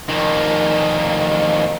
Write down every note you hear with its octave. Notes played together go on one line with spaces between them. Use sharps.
F2 D#3